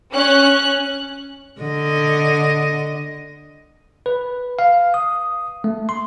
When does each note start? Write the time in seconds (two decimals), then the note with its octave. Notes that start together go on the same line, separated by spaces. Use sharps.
0.13 C#4 F#6
1.61 D3 D#5
4.06 B4
4.59 F5
4.94 D#6
5.64 A3
5.89 C6